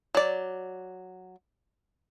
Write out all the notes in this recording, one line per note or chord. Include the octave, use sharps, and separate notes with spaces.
F#3 D5